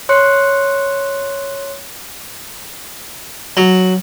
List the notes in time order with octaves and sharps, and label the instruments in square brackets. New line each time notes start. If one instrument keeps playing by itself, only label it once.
[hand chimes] C#5 C6 F#6 C#7
[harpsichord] F#3